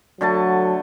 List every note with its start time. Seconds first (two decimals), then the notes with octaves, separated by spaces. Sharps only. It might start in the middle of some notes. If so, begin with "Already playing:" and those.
0.21 D3 F#3 A3 A5